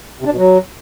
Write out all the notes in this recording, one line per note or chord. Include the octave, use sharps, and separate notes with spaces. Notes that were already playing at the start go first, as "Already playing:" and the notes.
C3
D4
B2
F#3